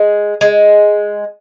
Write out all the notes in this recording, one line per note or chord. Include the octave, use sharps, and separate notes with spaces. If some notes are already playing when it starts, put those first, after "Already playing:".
Already playing: G#3
G#3